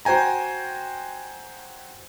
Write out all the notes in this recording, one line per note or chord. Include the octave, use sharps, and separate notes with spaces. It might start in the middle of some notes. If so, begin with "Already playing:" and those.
F#4 C5 G5 G#5 A#5